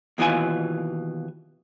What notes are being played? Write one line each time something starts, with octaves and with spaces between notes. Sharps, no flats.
D#2 B2 E3 F4 G#5